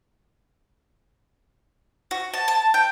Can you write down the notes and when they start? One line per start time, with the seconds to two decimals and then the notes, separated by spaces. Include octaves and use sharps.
2.11 F#4
2.34 A5
2.48 A5
2.74 G5